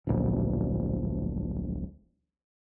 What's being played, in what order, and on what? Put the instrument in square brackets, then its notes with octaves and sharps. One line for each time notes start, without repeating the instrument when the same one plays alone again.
[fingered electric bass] D1 A#1